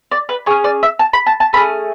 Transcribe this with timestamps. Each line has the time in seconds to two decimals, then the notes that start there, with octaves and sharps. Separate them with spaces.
0.11 D5
0.29 B4
0.46 C#4 G#4 C#5
0.64 D5
0.83 E5
0.99 A5
1.13 B5
1.27 A5
1.40 A5
1.53 A3 C#4 G#4 B5